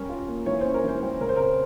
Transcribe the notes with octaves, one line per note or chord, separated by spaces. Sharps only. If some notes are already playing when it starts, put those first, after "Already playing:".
Already playing: G3 C#4 A#4
F4
A#3
E3 C#5
C#4 C5
A#4
E3 C5
G3
C#3 A#4
C5
C4 A#4